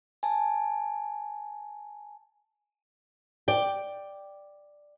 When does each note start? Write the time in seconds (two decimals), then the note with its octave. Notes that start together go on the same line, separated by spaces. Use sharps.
0.23 G#5 A5
3.48 D5 G5